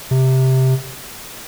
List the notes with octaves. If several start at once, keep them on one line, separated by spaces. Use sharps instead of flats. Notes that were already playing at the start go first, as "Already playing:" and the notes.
C3